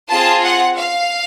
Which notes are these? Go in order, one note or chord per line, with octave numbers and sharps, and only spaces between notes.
C4 F4 G#4 A5
F#5
F5